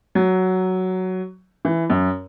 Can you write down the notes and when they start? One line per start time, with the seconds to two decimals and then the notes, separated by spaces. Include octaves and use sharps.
0.15 F#3
1.65 E3
1.90 F#2